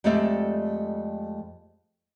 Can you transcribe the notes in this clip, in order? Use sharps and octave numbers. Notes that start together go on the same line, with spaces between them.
F2 G#3 A3 G4 D5 E5